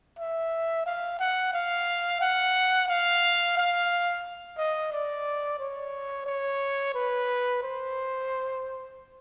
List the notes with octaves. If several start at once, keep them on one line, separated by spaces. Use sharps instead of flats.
E5
F5
F#5
F5
F#5
F5
F5
D#5
D5
C#5
C#5
B4
C5